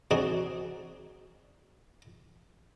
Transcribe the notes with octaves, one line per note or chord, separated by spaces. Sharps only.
C4 D4 D#4 F#4 G#4